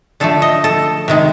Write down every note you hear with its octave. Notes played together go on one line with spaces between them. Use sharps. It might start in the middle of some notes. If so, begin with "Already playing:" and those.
D3 F3 A3 A4
D#5
A4
C3 D#3 G#3